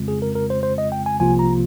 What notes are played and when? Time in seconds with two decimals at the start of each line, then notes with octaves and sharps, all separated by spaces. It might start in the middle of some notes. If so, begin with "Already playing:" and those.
Already playing: F2 C#3 G#3 C4 F4
0.08 G#4
0.22 A#4
0.35 A#4
0.50 C5
0.63 C5
0.78 D#5
0.92 G5
1.06 G#5
1.20 C2 C3 F3 A#3 F4 G#5
1.39 A#5